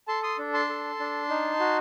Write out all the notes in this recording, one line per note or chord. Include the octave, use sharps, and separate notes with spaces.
A4 A5 C6
C6 D#6
D4
A5 C6
A4
D4
D#4
F#4